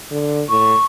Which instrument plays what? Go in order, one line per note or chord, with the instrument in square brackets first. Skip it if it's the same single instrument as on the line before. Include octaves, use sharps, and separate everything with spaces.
[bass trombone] D3
[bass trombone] A2 [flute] C#6